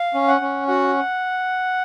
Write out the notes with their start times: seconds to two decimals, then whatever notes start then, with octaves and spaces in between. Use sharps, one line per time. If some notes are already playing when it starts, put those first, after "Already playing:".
Already playing: F5
0.14 C#4
0.28 F#5
0.41 C#4
0.68 F#4 F#5